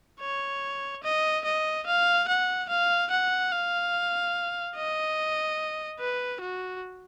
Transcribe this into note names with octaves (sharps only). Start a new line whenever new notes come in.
C#5
D#5
D#5
F5
F#5
F5
F#5
F5
D#5
B4
F#4